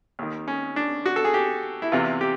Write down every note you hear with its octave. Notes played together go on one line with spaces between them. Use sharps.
D#2 D#3
C#4
D4
F#4
A4
G#4
G4
E4
E2 C3 E3 F4
G4